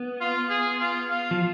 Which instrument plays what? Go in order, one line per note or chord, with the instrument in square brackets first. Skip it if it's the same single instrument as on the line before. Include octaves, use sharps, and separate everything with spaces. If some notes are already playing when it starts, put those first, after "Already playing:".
Already playing: [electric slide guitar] B3
[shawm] F4
G#4
F4
F4
[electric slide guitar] F3